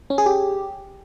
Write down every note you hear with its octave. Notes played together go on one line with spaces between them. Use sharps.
C#4
G#4
G4